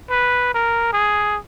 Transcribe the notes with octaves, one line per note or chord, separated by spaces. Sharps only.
B4
A#4
G#4